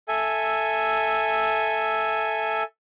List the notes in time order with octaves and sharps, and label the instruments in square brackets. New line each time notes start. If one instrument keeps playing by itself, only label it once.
[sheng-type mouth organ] A4 E5 G#5